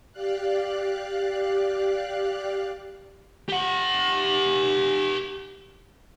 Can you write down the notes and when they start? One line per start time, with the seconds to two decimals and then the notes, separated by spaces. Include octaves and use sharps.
0.12 G4 D5 F5 F#6
3.49 G4 F#5